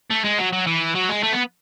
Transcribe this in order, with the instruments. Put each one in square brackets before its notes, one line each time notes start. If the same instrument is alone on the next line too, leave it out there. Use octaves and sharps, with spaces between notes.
[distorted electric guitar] A3
G#3
F#3
F#3
E3
F#3
G#3
A3
B3